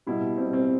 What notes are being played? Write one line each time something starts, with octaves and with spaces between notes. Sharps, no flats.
B2 G3 E4
B2 G3 C4
C4